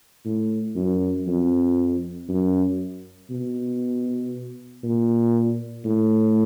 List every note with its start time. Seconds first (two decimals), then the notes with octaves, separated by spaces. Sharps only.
0.25 A2
0.76 F#2
1.27 F2
2.29 F#2
3.30 B2
4.83 A#2
5.85 A2